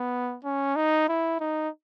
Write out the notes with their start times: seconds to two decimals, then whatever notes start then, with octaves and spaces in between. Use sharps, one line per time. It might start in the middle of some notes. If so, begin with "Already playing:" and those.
Already playing: B3
0.44 C#4
0.76 D#4
1.08 E4
1.40 D#4